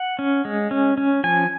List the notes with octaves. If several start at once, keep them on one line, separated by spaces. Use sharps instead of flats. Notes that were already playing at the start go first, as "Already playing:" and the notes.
Already playing: F#5
C#4
G#3
C#4
C#4
F3 G#5